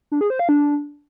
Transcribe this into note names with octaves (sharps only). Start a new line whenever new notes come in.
D4
G#4
C5
F5
D4